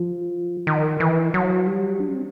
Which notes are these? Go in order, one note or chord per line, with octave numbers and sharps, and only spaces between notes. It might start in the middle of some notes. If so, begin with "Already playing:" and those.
Already playing: F3
D#3
E3
F#3
G3
D4
C#4
C4